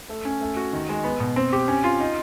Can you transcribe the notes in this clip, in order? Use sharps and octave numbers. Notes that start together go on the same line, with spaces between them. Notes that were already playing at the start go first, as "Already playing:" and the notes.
A3
C#4
A3
F#4
D#3
G#3
B3
B2
C4
G4
C#4
F4
D#4